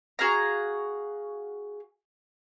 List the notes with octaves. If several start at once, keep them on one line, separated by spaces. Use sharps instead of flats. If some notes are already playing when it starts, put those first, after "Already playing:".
F#4 G#4 F5 A#5